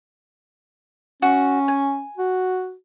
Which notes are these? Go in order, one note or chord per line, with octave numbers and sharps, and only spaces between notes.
C#4 F#4
G#5
F#4